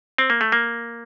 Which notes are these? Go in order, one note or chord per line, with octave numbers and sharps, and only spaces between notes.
C4
A#3
A3
A#3